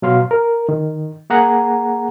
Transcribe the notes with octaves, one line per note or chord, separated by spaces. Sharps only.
B2 F#3 F5 C6
A#4
D#3
A#3 G#4 F#5 A#5